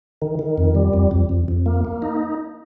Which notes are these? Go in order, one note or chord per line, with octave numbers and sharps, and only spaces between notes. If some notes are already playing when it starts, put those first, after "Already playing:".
D#3
D#3
F2
G3
F2
F2
F2
F2
A#3
A#3
D#4